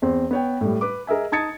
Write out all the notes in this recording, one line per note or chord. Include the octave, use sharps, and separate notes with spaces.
E2 C4
B3 C#5 G5
A2 G3
B4 D6
G#4 A#4 D#5 E5 G#5
D#4 A5 D#6 G#6 A6 C#7